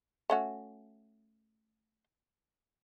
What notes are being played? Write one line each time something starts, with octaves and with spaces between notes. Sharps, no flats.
A3 C#4 F#4